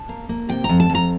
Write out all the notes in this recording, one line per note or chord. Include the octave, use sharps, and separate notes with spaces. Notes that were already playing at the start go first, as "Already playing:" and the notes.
Already playing: A5
A#3
A#3
C3 G5
A#5
F2
A5
F2
A#5